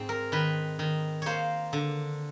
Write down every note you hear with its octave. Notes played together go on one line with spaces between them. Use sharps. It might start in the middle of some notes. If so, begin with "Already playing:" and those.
Already playing: G#2 C4
A#4
D#3 B4
D#3
A#3 C5 C#5
D3